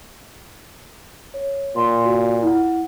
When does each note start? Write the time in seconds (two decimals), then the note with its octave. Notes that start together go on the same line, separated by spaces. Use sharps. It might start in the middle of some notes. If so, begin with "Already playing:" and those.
1.34 C#5
1.76 A#2 C6
2.04 F#4 A#4
2.42 E4 F#5